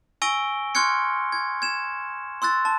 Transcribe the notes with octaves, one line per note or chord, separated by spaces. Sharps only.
G#5 C#6 E6 A#6 D7 G7
C6 C#6 F6 F#6 G#6 C#7
G#6
G#6 E7
C6 E6 F#6 A6
A5